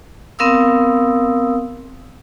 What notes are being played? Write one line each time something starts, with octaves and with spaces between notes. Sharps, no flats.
B3 C4 A#4 F5 D#6 E6